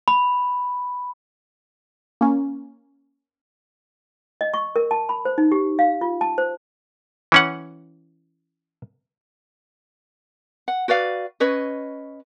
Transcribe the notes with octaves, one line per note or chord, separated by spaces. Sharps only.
B5
A#3 C#4
D#5
C#6
A#4
A5
B5
C5
D#4
G4
F5
F4
A5
C5
E3 C#4 F#5
F#5
F#4 B4 D5 F5
C#4 B4 C#5 D#5